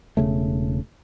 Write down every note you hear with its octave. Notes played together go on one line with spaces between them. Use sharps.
E1 C#3 A3